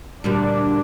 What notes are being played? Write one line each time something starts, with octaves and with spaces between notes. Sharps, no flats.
D2 A#2 G3 D4